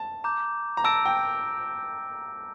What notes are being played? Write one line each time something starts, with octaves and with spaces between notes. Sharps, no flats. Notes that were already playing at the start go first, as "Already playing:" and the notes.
Already playing: A5
A#5 D6 G6
A#5
A5 E6 A#6 D7
G5